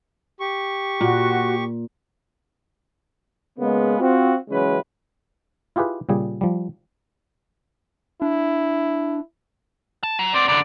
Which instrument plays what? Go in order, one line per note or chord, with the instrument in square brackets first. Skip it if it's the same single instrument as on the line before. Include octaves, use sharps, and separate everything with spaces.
[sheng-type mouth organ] G4 C#6
[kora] A#2 [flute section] F#4
[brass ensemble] C#3 G#3 A#3 B3
C4 F4 F#4
C#3 E3 F#3 G#3 C#4 B4
[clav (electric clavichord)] E4 F4 G4 G#4 B4
A#2 C#3 G3 G#4
F3 G3
[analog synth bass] D4 [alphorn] E4
[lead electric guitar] A5
F#3
[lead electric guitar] B3 C4 [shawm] D5
[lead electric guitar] C2 D3 [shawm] D5